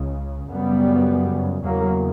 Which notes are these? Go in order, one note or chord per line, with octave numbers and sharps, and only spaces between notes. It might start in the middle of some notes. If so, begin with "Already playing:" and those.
Already playing: C#2 C#3
F#2 C#3 G3 B3
E2 C#3 F#3 A#3